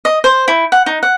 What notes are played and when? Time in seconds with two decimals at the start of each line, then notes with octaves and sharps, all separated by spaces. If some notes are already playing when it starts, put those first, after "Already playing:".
0.05 D#5
0.24 C5
0.48 E4
0.72 F#5
0.86 D#4
1.03 F#5